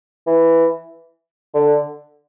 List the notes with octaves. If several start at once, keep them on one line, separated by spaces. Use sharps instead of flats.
E3
D3